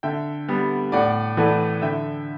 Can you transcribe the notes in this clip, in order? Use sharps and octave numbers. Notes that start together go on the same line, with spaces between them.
D3 E5 G5
G3 B3
A2 D5 F#5
E3 A3 D5 F#5
D3 E5 G5